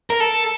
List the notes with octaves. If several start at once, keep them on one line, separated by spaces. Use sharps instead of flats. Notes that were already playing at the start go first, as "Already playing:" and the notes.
A#4
A4